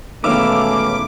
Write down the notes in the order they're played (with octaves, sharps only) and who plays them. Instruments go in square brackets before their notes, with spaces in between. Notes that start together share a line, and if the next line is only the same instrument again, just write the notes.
[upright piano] E1 D#3 [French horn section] A3 C#4 [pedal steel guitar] B4 E5 F5 [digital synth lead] D6